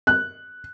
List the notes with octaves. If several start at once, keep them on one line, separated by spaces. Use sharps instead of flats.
F#6